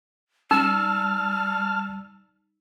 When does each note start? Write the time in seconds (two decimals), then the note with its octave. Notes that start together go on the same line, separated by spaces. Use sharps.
0.51 G3 D#4 A5 E6 F6